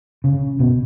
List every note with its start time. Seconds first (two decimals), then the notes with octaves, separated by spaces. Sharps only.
0.24 C#3
0.60 B2